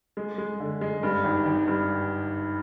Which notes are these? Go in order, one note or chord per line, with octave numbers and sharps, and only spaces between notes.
G#3
G#3
D3
G#3
G2
G#1
G#1
G2